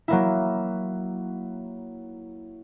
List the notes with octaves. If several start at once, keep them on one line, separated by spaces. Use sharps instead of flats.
F#3 A#3 E4